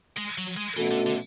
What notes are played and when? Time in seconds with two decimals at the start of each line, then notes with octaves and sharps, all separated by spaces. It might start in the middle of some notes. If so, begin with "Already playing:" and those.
0.17 G#3
0.38 F#3
0.57 G#3
0.76 B2 E3 A3 C#4 F#4 A4
0.91 D3
1.06 D3